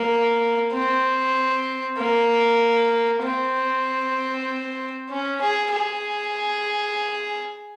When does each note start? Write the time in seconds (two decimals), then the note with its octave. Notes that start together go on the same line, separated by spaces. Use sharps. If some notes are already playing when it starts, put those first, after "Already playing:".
Already playing: A#3
0.72 C4
1.98 A#3
3.22 C4
5.09 C#4
5.41 G#4
5.73 G#4